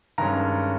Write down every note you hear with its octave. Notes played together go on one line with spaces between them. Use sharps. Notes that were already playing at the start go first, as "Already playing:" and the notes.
G2 D#3 G#3 C#4 A#5